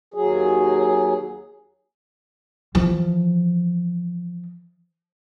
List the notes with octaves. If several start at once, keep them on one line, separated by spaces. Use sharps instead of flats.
D#2 F#3 G#4
E3 F3